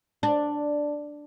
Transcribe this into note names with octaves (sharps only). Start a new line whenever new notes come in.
D4